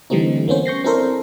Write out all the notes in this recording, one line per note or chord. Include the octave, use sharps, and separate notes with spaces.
D3 E3 G3 A3 C4 D#4
A#3 B3 C#4 C5
C#6 G6 A#6 C7
C4 D4 E4 A4 A#4 C5